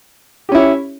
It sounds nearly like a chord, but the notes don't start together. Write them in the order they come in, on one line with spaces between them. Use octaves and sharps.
G4 C#4 E4 C#5